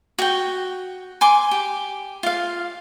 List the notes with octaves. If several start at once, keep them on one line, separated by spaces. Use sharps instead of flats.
F#4 G5
G#5 C6 D6
G4
F4 F5